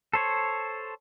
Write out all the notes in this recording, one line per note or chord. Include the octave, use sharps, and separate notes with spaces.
A4 C5 C#5